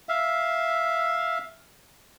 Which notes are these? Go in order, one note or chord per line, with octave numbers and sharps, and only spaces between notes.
E5 F5